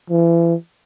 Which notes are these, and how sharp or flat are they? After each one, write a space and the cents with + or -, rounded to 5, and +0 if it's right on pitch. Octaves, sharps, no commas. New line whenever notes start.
E3 +35